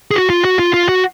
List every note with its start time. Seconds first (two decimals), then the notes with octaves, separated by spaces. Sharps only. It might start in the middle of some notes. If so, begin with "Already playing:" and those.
0.11 G#4
0.16 F#4
0.30 F4
0.45 F#4
0.59 F4
0.74 F4
0.89 F#4